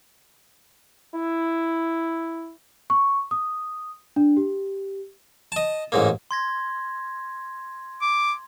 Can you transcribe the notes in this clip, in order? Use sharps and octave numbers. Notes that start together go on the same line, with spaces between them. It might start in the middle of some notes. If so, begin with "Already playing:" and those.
E4
C#6
D#6
D4
G4
D#5 A5
A1 G#2 A#3
C6 G#6 A#6
D6